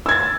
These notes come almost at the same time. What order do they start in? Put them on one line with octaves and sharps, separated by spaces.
E6 G#6 A6